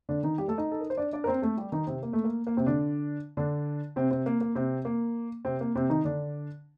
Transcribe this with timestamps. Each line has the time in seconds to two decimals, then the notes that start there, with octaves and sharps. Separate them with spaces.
0.09 D3 D4
0.23 D#3 D#4
0.38 G3 G4
0.48 A3 A4
0.58 D#4 D#5
0.72 A4
0.81 A#4
0.90 C5
0.97 D4 D5
1.13 D4 D5
1.24 A#4
1.27 C4 C5
1.42 A3 A4
1.57 G3 G4
1.72 D#3 D#4
1.87 C3 C4
2.03 A#3
2.13 A3
2.24 A#3
2.47 A#3
2.57 C3 C4
2.67 D3 D4
3.37 D3 D4
3.96 C3 C4
4.11 C3 C4
4.26 A#3
4.41 A#3
4.55 C3 C4
4.85 A#3
5.45 C3 C4
5.61 A#3
5.75 C3 C4
5.90 D#3 D#4
6.04 D3 D4